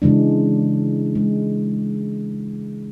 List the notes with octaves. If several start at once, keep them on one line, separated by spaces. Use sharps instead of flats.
C#3 E3 G#3 D4
G#3